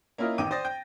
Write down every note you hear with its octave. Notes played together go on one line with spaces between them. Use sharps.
A#3 C#4 E4 F4 A#4 D#5
A1 D#3 D#4 G5 D6 D#7
C5 D5 G5 D#6 A6 A#6
G5 G6